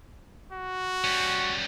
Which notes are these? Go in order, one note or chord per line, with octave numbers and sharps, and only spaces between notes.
F#4
G3 C#4